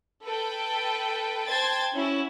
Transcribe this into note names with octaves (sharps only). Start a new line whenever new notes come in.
A4 B4 G5
C5 G5 A5 C6 G#6 A6
C#4 E4 F#4